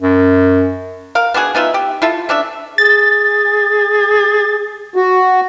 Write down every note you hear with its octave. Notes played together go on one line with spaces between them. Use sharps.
F#2
A#4 F5
B3 D4 F#4 G#4
B3 D#4 F4 E5
G4
E4 F4 A4
C#4 D4 E5
G#4 A6
F#4